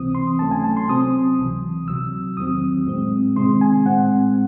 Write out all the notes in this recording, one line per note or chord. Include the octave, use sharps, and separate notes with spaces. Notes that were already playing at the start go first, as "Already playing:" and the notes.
Already playing: C#2 C3 E3 C4 D#6
C6
C#2 C3 F#3 A3 C#4 A5
G#5
A5
C6
C3 F#3 C4 D#6
C#2 C3 E3
C2 C3 F#3 E6
E2 D#3 F#3 C4 D#6
A2 G#3 C4
C3 D#3 G#3 C4 C6
G#5
A2 G#3 C4 F#5